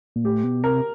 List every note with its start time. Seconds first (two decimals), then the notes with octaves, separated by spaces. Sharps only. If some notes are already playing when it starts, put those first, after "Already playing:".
0.16 A#2
0.24 A2 G4
0.44 B2
0.63 C3 A#4